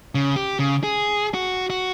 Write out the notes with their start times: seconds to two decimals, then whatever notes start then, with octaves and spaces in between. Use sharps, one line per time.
0.15 C#3
0.36 G4
0.59 C#3
0.83 G#4
1.34 F#4
1.70 F#4